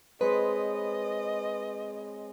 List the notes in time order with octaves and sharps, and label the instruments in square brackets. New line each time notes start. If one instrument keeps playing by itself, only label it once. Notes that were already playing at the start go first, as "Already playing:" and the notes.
[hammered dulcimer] G#3 C4 C#5 [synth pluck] B4 [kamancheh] D#5